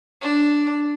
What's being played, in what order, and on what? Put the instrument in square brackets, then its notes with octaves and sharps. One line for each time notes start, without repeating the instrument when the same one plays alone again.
[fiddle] D4